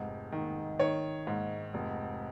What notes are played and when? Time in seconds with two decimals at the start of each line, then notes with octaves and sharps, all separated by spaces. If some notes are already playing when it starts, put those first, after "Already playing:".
Already playing: F1 G#2
0.32 D#3
0.79 D#3 C#5
1.27 G#2
1.74 F1